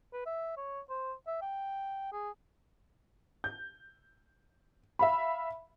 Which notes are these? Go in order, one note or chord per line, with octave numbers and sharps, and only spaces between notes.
B4
E5
C#5
C5
E5
G5
G#4
G6
E5 F5 B5